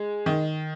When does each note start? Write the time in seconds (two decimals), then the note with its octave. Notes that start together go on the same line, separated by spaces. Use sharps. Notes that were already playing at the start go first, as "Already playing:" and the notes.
Already playing: G#3
0.26 D#3